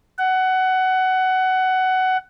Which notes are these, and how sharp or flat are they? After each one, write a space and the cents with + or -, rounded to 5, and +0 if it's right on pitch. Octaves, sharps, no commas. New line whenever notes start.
F#5 +15